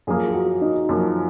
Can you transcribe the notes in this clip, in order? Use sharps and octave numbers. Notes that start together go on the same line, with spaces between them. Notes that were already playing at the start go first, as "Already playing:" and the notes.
F#2 F3 A#3 G#4
G#4
F#4
D#4
F#2 F3 A#3